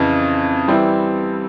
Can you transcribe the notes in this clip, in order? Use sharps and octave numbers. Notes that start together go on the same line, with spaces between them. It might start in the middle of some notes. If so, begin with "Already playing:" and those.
Already playing: F2 C#3 E3
E3 G3 C4 E4